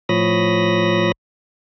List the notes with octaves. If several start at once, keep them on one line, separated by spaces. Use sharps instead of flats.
A2 F3 C#5 B5 D#6 A#6